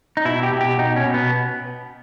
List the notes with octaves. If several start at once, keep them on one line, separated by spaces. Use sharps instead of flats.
D#4
B2 E4
G4
B2
G4
B2 D#4
C#4
B2
B3